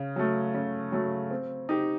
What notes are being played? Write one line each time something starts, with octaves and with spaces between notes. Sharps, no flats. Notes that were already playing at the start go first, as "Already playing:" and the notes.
Already playing: C#3
F#3 A3
C#3
F#3 A3
C4
D#4 G4